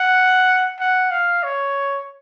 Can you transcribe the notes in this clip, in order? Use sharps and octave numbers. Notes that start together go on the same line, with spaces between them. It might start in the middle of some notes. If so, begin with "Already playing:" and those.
Already playing: F#5
F#5
F5
C#5